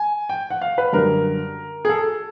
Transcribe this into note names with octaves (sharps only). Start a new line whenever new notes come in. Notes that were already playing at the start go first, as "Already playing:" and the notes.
Already playing: G#5
G5
F#5
F5
B4
F#2 D3 G3 A#4
G#4
A4